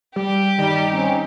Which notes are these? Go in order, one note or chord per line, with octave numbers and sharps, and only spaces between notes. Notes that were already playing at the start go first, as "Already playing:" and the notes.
G3 G4
G2 D#3 G3 D#4
C4 C#4